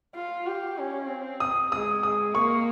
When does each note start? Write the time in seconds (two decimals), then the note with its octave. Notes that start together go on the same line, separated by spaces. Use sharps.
0.15 F4
0.47 G4
0.78 C#4
1.09 C4
1.40 D#6
1.72 G#3 D#6
2.03 G#3 D#6
2.34 A#3 C#6